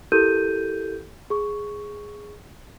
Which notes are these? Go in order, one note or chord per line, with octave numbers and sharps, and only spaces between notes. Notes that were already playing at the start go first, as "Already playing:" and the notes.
E4 G4 A4 A#4 G6 D#7
G#4 C#6